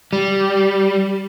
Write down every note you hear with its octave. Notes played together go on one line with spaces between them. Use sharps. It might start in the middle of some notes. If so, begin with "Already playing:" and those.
G3